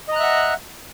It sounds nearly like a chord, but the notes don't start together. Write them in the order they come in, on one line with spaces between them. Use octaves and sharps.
D#5 A#5 F#6 E5 F#5